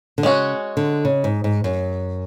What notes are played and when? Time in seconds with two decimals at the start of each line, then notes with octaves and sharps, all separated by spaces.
0.18 D3
0.23 C#3 G#3 C#4 F#4
0.77 D3
1.05 C#3
1.24 G#2
1.44 G#2
1.64 F#2